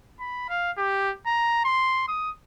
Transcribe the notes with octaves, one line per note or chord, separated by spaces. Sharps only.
B5
F5
G4
A#5
C6
D#6